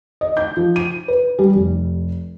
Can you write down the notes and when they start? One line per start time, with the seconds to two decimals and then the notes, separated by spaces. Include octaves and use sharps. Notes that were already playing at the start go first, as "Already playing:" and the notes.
0.21 D#5
0.37 G6
0.57 F3
0.76 D#7
1.08 B4
1.39 G3
1.55 F1